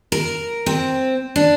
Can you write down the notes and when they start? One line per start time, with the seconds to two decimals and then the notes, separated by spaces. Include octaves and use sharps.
0.12 A#4
0.66 C4
1.36 D4